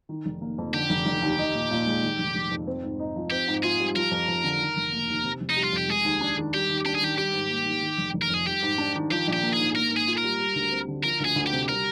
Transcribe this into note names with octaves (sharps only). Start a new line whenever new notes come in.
D#3
F1
A#3
F2
D3 G4
F1
F1
D#2
D#4
A#2
A#2
G#3
D#3
F1
F1
F2
C4
G#2
D#4
F3
C4 G4
G#2
F4 G#4
G3
F3 A#4
F2
F2
D3
D#3
F1
A#3
D#2
C3
F1
D#4
G3
F4
F2 G4
G#3 G#4
D#2
D4
D#3
G3 G4
D#2
D4 G4
G#4
D#3 G4
G3 G4
G#2
A#3
D#3
D#3
F1
F1
A#4
F2 G#4
G3 G4
G#2
D4
D#3
F3 G4
A#1
G4
A#3
G#4
G#2
A#3 A#4
G#2
G#4
F4
A#4
G3
G3
D2
C4
D3
F3 A#4
D2 G#4
D2
G4
C3
G3 A#4